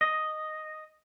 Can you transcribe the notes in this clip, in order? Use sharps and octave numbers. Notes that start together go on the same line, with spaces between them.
D#5